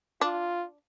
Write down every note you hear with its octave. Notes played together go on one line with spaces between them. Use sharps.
D4 F4